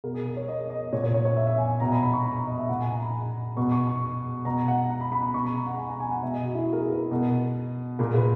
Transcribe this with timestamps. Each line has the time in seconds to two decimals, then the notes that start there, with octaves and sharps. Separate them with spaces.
0.04 B2 A#4
0.14 G#4
0.26 A#4
0.37 C#5
0.48 D#5
0.70 D#5
0.92 A#2 C#5
1.04 C#5
1.14 C#5
1.25 C#5
1.37 E5
1.47 E5
1.58 G#5
1.80 B2 A#5
1.91 B5
2.03 B5
2.13 C#6
2.24 B5
2.36 A#5
2.47 D#5
2.58 E5
2.69 A#2 F#5
2.81 G#5
2.91 A#5
3.02 B5
3.57 B2 C#6
3.72 C#6
3.87 C#6
4.45 B2 A#5
4.68 F#5
4.89 A#5
5.01 B5
5.12 B5
5.23 B5
5.34 B2 C#6
5.45 B5
5.56 A#5
5.66 F#5
5.78 G#5
5.90 A#5
6.00 G#5
6.11 F#5
6.22 B2 E5
6.34 D#5
6.45 F#4
6.55 E4
6.67 F#4
6.73 A#4
6.77 G#4
6.89 B4
7.11 B2
7.99 A#2 A#4
8.14 B4